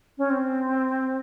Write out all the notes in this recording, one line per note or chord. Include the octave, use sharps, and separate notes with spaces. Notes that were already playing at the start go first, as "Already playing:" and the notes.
C#4
C4